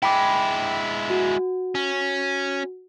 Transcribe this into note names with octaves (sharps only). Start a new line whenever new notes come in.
G#3 E4 G5 B5 D6
F#4
C#4